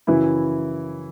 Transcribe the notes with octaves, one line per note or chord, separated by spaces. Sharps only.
F#2 C#3 E3 F#3 E4